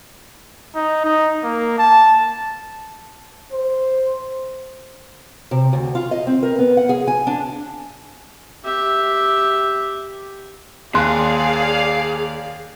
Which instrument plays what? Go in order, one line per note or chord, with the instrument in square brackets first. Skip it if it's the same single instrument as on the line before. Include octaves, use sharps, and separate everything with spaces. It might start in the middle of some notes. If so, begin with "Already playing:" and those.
[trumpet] D#4
D#4
A#3
A5
[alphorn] C5
[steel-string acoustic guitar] C3
D2
F4
D#5
C4
A#4
B3
F#5
G#4
G#5
D4
[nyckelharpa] G4 E5
[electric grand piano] D#2 [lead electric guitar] G#4 [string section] D5 F5 [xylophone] C6 F#6